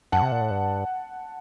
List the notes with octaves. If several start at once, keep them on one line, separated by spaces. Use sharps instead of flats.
F#2 F#5 A5
C3
A#2
A2
G2